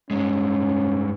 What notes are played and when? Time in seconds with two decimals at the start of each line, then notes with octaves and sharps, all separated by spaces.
0.11 G2 G#3 C#4